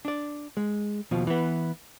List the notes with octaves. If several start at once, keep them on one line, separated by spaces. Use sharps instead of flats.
D4 D5
G#3
D#2 B2 F3
E3 B3